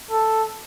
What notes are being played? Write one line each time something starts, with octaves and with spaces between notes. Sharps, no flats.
A4